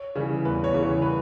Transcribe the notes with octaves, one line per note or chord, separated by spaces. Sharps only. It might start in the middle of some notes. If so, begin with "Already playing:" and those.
Already playing: C#5
C#3 E3 G3
E2 B4
C#5
C#3 E3 G3
C#5
B4